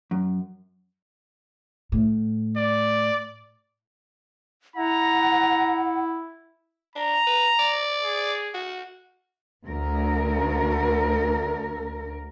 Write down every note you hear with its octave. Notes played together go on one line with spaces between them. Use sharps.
F#2
A2
D5
E4 F#5 A#5
D4 A#5
B4
D5
G#4
F#4
D2 A#4